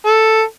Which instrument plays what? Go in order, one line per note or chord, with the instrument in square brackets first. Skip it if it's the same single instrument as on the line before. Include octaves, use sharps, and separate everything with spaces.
[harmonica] A4